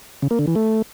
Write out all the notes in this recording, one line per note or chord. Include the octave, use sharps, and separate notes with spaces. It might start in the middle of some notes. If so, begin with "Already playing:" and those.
C#3
A#3
D3
E3
A3